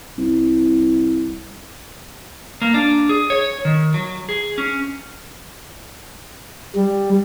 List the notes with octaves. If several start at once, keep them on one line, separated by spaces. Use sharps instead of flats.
C2
A#3
D4
G#4
C#5
D#3
F#3
G#4
C#4
G3